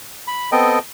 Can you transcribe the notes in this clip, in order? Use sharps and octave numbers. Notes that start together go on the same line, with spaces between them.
B5
B3 C4 A4 D#5 G5